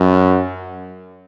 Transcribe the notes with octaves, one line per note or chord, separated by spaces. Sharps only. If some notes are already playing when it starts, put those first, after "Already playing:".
Already playing: F#2